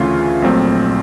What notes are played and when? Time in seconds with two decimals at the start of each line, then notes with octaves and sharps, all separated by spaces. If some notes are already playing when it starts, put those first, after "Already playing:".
Already playing: D2 C#3 E3 A3 C#4 F4
0.42 A#1 A#2 F#3 A3 C4